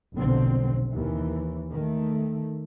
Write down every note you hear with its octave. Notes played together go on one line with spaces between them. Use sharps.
F1 B1 B2 D3 C4
D#2 E3
D#3 A3